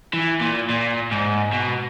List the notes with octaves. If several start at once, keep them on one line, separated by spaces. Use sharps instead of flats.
E3
A#2
A#2
G#2
B2